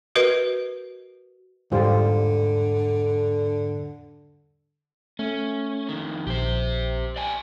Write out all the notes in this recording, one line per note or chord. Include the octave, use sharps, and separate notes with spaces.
F#4 A#4 B4 D#5
E2 G#2 D3 G3 F4 C5
A3 C#4
F2 D#3
A#1 G4 C5
D5 G5 G#5